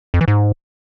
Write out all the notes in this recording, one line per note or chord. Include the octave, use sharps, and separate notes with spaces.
F2
E3
G#2